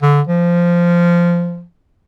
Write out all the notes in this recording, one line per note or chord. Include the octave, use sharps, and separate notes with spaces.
D3
F3